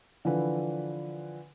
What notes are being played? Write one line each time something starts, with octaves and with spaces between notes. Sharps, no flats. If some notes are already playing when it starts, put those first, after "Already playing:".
D3 E3 F3 B4